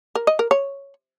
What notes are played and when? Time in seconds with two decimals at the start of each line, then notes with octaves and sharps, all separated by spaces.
0.15 A#4
0.27 D#5
0.39 A#4
0.51 C#5